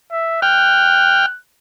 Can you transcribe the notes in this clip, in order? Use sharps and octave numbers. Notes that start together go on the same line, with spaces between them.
E5
G5 F6 F#6